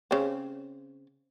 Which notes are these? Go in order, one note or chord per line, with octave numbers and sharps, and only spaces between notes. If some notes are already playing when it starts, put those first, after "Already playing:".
C#3 C4